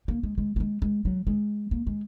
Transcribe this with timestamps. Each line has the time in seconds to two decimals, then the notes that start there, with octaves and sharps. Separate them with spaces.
0.08 A#3
0.23 G#3
0.38 G#3
0.56 A#3
0.60 G#3
0.82 G#3
1.05 F#3
1.27 G#3
1.71 A#3
1.87 G#3